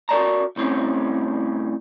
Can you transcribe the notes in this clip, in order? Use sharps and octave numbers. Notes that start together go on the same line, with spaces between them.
F#4 A#4 C5 D5 A5 A#5
C2 A2 C4 C#4